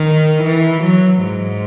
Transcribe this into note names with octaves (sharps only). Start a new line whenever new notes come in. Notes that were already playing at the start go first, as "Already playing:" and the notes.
Already playing: D#3
E3
F#3
G#2